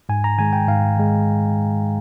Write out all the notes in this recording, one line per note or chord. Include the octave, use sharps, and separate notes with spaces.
G#2 G#5
A#5
D#3 G#3 G#5
G5
G#2 F5
D#3 G#3